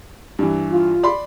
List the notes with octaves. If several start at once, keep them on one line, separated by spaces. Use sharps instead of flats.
G2 E3
F4
D5 B5 C6